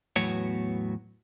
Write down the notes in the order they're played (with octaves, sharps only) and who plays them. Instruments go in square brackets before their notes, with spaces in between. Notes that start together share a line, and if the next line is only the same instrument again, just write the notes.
[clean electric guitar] E2 A2 F#3 B3 F#4 C#5